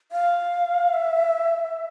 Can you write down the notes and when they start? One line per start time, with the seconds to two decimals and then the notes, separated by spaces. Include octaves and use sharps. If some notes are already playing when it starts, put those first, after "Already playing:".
0.12 F5
0.94 E5